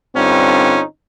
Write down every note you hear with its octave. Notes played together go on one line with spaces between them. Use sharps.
G2 D3 C4 C#4 D#4 F4